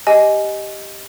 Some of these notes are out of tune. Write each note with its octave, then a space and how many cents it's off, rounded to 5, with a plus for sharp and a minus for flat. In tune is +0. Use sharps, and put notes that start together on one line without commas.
G4 +0 D#5 +0 G#5 +20